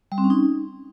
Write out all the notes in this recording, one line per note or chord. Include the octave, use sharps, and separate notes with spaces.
G3
C4
C#4
D#4